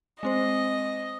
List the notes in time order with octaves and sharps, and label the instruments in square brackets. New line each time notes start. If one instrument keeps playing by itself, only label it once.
[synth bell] G#3 C4 C5 [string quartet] D#5